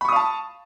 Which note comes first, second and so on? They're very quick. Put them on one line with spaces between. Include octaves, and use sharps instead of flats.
B5 C#6 D#6 F5 A5